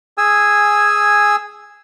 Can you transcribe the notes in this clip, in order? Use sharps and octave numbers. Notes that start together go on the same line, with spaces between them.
G#4 G#5 E6